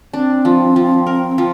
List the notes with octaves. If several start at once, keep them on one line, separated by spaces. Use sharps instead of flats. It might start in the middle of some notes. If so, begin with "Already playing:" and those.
C4 D4
F3
F3
A#4
F3